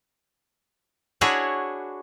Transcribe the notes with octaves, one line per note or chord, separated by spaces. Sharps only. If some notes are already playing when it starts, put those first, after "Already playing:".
D4 E4 F#4 G#4 C#5 F#5